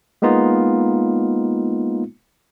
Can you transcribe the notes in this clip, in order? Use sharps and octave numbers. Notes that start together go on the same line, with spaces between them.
G#3 A#3 B3 D#4 F4